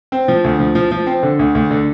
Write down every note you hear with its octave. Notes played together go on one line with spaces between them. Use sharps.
C4
F3
D2
F3
F3
F3
C4
D3
D2
D2
D3